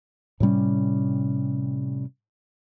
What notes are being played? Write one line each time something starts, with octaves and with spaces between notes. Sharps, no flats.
A2 C3 G3 C#4